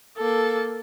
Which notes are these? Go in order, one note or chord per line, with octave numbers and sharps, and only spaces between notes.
A#3 A4